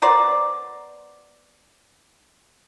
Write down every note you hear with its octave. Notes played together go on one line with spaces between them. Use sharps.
B3 A#4 C5 D5